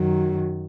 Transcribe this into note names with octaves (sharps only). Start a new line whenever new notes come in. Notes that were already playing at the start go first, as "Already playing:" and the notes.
Already playing: F#2 D#3 F#3